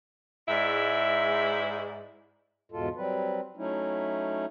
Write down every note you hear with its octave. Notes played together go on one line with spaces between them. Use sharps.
G#2 G#3 E4 D5 E5
E2 G#2 B2 G#3 F4 A4
F#3 G3 C4 B4
F#3 A3 C#4 D#4 E4